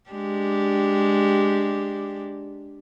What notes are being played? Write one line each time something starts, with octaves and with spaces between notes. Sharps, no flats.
G#3 D4 G4